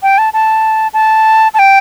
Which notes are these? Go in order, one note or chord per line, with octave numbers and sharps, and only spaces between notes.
G5
A5
A5
A5
A5
G5